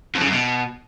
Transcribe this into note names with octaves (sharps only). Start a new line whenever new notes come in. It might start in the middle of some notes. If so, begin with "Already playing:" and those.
F2
C#3
F#2
B2